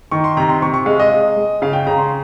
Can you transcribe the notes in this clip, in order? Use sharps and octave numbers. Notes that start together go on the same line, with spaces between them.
D#3 C#6
C6
C3 A#5
C6
C3 C#6
C#6
G#3 F5
D#5
G#3
G#3
C#3 F5
G5
C#3 A#5
C6